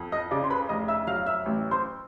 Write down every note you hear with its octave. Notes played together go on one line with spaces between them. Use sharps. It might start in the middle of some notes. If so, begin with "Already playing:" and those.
Already playing: F2
D#5 D#6
C#3 D5 D6
C6
B4 B5
F1 D#5 D#6
E5 E6
F#3 F5 F6
E5 E6
A1
C5 C6